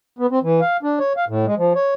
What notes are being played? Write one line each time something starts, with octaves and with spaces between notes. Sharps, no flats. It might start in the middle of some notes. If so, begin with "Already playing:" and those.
B3
C4
E3
F5
D4
C#5
F5
A2
G#3
F3
C#5